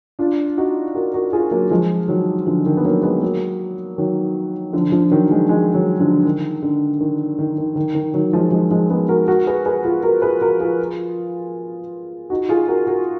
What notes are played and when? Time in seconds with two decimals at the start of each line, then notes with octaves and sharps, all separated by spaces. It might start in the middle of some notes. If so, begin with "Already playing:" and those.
0.19 D4 F4
0.57 D#4 F#4
0.95 F#4 A#4
1.14 F#4 A#4
1.33 F4 G#4
1.51 F#3 A#3
1.70 F3 G#3
2.08 D#3 F#3
2.47 D3 F3
2.66 D#3
2.77 B3
2.85 F#3 A#3
3.03 G#3 B3
3.22 F#3 A#3
3.98 D#3 F#3
4.73 D3 F3
4.92 D3 F3
5.11 D#3 F#3
5.31 F3 G#3
5.49 F3 G#3
5.74 D#3 F#3
6.00 D3 F3
6.25 D#3
6.63 D3
7.00 D#3
7.39 D#3
7.58 D#3
7.76 D#3
7.95 D#3
8.14 D#3 F#3
8.33 F3 G#3
8.51 F3 G#3
8.71 F3 G#3
8.90 G#3 B3
9.09 F#4 A#4
9.28 F#4 A#4
9.47 G#4 B4
9.66 G#4 B4
9.85 F4 G#4
10.03 F#4 A#4
10.22 G#4 B4
10.41 F#4 A#4
10.60 F4 G#4
12.30 D#4 F#4
12.49 F4 G#4
12.68 F#4 A#4
12.87 F#4 A#4